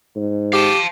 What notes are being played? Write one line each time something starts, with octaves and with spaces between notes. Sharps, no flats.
G#2
G4 F5 A5